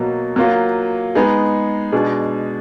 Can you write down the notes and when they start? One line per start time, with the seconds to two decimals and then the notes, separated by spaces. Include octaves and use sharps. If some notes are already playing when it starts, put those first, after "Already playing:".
Already playing: B2 F#3 A#3
0.36 F#3 A#3 F4
1.15 G#3 B3 D#4 G#4
1.92 B2 G#3 D4 G#4